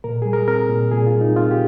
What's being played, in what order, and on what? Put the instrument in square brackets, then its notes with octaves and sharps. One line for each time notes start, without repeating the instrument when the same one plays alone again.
[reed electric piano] A#2 A#4
G3 G#4
A#4
C4 A#4
A#2
A#2 G#4
F4
G3
D#4
C4 F4
G4